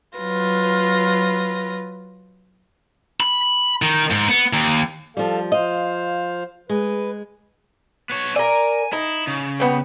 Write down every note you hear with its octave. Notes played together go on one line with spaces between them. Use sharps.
F#3 F4 B4 A#6
B5
D#3
G#2
B3
D#2
F3 G3 A4 F5
F3 C5 D#5 F5
G#3 B4
B3 C#5
A#4 D5 G#5
D#4 E4
C#3
G3 B3